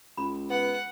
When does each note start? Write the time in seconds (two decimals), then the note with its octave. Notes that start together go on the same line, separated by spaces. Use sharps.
0.17 C#2 B5
0.50 B3 F#5